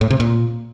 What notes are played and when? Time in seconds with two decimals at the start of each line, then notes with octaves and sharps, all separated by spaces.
0.01 A2
0.11 C3
0.20 A#2